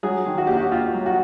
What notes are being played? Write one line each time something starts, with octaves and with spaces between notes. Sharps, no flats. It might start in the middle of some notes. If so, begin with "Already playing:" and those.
F#3 G#4
D#3
F#4
D#2 G4
F#4
D#2 F4
F#3
F#4